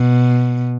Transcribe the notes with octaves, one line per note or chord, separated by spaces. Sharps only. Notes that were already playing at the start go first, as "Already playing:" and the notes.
Already playing: B2